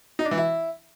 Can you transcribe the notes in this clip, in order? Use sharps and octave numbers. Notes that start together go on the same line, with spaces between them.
D#4
D4
E3
E4